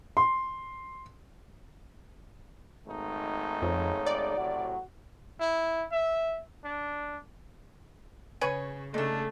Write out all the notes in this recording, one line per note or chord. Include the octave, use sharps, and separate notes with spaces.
C6
G#1 A3 D#4
F2 C#3
D5
A2 C3 F#3 F#4
E4
E5
D4
C#3 G#4 B4 C#5
C#3 A3 D4 D#4 A4